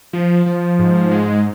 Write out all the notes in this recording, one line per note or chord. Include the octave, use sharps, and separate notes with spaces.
F3
F3
G#2
G#3